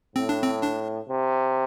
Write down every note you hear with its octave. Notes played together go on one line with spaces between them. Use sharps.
A2 C4
D4
C4
D4
C3